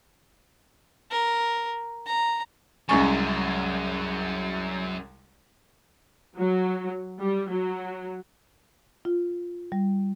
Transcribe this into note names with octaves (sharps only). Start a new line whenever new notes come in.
A#4
A#5
C2 F#2 G#3 C#4 G#5 C#6
F#3
G3
F#3
F4
G3